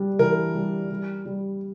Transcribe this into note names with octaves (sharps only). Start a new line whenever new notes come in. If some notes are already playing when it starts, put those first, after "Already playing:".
Already playing: G3 D4
E3 A#4
G3
G3
G3